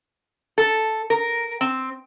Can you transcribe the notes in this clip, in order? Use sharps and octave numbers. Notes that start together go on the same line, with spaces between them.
A4
A#4
C4